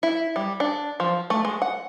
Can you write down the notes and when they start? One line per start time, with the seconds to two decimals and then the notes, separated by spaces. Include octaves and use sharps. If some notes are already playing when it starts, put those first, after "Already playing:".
0.03 E4
0.36 G3
0.60 D4
1.00 F3
1.30 A3
1.45 G#3
1.62 F#5